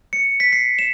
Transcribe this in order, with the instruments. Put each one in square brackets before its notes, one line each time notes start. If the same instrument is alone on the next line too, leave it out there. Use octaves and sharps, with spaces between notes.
[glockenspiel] C#7
B6
C7
E7